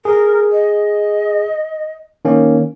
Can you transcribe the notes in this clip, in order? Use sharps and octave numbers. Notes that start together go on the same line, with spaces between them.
G#4 A#4
D#5
D#3 A#3 C#4